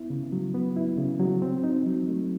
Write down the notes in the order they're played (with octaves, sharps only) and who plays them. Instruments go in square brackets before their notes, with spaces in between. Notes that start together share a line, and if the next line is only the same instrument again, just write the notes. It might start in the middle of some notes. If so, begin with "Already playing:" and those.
Already playing: [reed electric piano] B3 E4
C#3
F#3
B3
E4
C#3
F#3
C4
D#4
F#3
A3